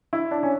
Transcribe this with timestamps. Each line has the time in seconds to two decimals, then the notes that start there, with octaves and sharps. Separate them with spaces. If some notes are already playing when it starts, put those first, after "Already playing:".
0.13 E4
0.31 D4
0.43 C#4